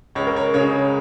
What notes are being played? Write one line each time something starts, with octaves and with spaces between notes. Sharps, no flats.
C#2 C#5
A#4
C#5
C#3 G#3 C#5